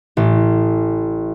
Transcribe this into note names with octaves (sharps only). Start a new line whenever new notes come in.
A1